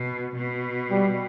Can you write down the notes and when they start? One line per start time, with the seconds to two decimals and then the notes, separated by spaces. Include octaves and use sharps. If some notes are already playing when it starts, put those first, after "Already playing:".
Already playing: B2
0.36 B2
0.91 G3